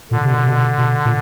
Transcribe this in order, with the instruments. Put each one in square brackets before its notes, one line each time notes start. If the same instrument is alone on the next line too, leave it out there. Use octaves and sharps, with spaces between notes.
[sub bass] A#2 [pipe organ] D3
[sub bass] C3
B2
C3
B2
B2
A#2